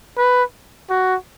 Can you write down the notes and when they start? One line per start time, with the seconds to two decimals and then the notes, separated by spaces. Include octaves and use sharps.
0.18 B4
0.90 F#4